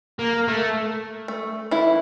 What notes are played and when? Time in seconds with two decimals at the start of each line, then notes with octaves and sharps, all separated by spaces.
0.19 A#3
0.48 A3
1.28 A3
1.71 E3 E4